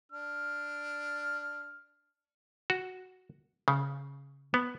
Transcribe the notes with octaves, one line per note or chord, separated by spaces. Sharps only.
D4 F6
F#4
C#3
B3